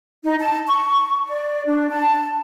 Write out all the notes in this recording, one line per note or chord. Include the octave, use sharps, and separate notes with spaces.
D#4
A5
C#6
D5
D4
A5